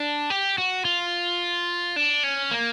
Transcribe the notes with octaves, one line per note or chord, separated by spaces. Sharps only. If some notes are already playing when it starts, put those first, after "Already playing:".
Already playing: D4
G4
F#4
F4
D4
C#4
A#3